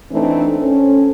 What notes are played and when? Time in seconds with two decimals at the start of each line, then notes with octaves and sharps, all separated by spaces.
0.12 E3 A3 C4 D4 D#4
0.60 C4 C#4 A4